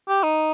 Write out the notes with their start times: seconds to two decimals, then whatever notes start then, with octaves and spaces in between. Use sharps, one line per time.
0.08 G4
0.23 D#4